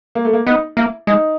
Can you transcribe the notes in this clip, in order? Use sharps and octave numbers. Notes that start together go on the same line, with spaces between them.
A#3
A3
A#3
B3 D#4
A#3 E4
G#3 D#4